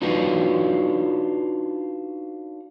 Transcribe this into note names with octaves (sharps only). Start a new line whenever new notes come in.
D4 D#4 F4 F#4 B4